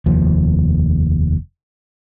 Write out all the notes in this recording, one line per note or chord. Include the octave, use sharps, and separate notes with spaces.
F1 D#2 F3